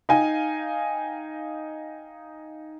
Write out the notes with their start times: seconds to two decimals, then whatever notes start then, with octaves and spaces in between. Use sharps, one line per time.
0.09 D#4 F5 G5 G#5